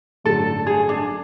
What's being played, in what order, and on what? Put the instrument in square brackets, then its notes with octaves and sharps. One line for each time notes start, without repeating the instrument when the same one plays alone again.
[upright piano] A1 G2 D3 F#3 A3 [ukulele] A4
[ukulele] G#4
D4